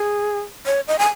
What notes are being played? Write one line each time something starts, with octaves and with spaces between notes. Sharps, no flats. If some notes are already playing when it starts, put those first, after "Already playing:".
Already playing: G#4
C#5
D#5
G#5